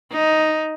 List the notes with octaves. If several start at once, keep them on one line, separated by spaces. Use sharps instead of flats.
D#4